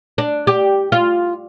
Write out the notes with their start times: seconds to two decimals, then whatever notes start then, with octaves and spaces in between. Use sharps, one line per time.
0.18 D4
0.47 G4
0.92 F4